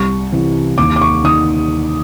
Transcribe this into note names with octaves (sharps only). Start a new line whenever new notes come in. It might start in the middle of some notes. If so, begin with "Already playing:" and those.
Already playing: C2 C#6
C3 E3
D#2 D6
D6
C#6
D#3 D#6